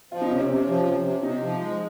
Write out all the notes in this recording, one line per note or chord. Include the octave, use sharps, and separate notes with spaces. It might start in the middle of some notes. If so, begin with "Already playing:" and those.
F3 F4
D#4
C3 C#4
C4
C3 C#4
F3
C3
C3
C3 D#4
F3
G#3